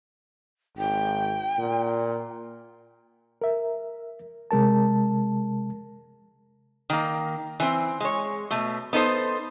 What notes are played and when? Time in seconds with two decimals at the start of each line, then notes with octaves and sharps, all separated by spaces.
0.77 G#1 G5
1.58 A#2
3.42 A#4 E5
4.51 C3 G#3 A#4 A5
6.90 D#3 A#3
7.60 E3 C4
8.00 G#3 C#5
8.51 B2 A3
8.93 B3 D#4 A4 C5